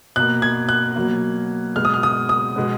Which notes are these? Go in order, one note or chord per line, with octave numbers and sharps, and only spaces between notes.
B2 A#3 F#6
G#6
F#6
B2 F#3 A#3
B2 G#3 B3 F6
D#6
F6
D#6
D#6
B2 G#3 B3